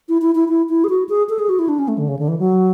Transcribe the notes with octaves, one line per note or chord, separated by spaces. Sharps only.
E4
E4
E4
E4
E4
G#4
F#4
G#4
A4
G#4
F#4
E4
D4
C#4
A3
D3
C#3
D3
E3
F#3